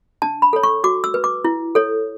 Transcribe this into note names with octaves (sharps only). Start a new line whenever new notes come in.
D4 A5
B5
A4 C#5
C#6
F#4 D6
E6
B4
D6
E4
A4 C#5